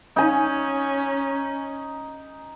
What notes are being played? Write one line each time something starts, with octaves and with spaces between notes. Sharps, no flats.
C#4 D#4 G#5